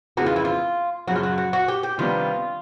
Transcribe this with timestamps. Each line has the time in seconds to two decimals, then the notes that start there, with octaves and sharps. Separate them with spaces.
0.17 F2 C#3 E3 G#3 B3 F#4
0.26 F4
0.36 E4
0.45 F4
1.07 F#2 C#3 F#3 F#4
1.16 F4
1.23 F#4
1.38 F#4
1.53 F#4
1.68 G4
1.83 G4
1.98 C3 D#3 G3 B3 D4 F4